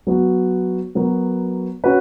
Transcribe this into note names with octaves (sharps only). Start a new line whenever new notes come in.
F#3 B3 F#4
F#3 B3 F#4 A#4
C#4 F#4 B4